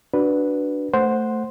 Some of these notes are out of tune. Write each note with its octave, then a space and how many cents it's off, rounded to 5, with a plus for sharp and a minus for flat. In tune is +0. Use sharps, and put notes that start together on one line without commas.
D4 +0 F#4 +0 B4 +0
A3 +10 C5 +0 F#5 -5